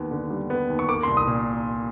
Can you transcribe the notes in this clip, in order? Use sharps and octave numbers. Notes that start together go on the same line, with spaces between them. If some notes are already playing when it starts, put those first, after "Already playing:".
Already playing: D#2 B3
D3
G3
B3
D#2
C#6
A#3 D6
C6
C2
D#6
A#2